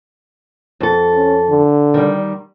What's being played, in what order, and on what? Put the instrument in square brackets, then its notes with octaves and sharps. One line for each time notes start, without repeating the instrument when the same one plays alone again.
[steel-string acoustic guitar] F2 A4
[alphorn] C#4
D3
[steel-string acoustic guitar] D#3 G3